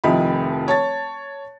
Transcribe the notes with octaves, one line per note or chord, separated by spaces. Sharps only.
F1 D#3 F3 E4 B5
C#5 A5 A6